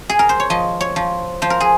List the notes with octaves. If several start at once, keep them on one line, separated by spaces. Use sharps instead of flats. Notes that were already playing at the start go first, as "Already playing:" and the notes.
G#4
A#4
C5
C#5
F3 D#5
C#5
F3
F3 C5
A#4
G#4